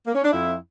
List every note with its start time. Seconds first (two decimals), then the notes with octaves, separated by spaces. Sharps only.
0.06 A#3
0.15 C#4
0.23 D4
0.32 F2 E4